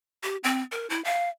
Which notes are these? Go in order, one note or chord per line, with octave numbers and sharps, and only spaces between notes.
G4
C4
A#4
E4
F5